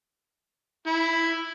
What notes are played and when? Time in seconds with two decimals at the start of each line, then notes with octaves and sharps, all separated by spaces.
0.87 E4